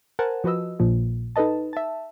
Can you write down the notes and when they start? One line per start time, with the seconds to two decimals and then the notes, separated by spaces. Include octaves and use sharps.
0.19 A#4 C5 F#5 G#5 A5
0.44 F3 F#4 B4 D#5 E6
0.79 A#1 A#2 F3
1.36 D#4 A4 B4 D#5 A5
1.73 E5 A5